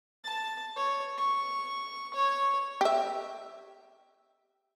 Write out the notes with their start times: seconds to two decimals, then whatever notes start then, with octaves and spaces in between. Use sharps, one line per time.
0.25 A5
0.77 C#5
1.18 C#6
2.14 C#5
2.81 G4 E5